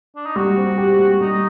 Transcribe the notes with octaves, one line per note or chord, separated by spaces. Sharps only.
D4
D#4
G3 F#4
C4
G4
G3
G3 D#4